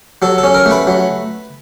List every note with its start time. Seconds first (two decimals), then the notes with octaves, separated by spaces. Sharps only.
0.22 F#3 A4
0.38 A4
0.44 C#4
0.54 A#4
0.66 A3
0.71 B4
0.87 F#3